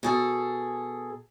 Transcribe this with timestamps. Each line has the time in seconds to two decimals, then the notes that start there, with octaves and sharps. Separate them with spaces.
0.03 B2 G#4 A4